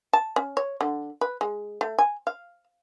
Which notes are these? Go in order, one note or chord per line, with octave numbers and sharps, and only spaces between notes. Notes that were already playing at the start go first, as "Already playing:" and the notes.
A5
C#4
C#5
D3
B4
G#3
A3
G#5
F5